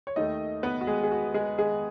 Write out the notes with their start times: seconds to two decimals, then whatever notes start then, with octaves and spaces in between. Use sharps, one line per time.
0.07 C#5
0.16 D#2 D#3 A3 D#4 D#5
0.63 B3 B4
0.81 F#4
0.87 G#3 G#4
1.03 G#4
1.12 F#4
1.34 G#3 G#4
1.59 G#3 G#4